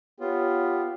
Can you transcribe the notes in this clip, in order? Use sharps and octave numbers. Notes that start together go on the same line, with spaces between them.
B3 F4 G4 C#5